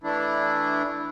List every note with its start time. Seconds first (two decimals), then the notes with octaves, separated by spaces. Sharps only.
0.03 E3 A3 D4 E4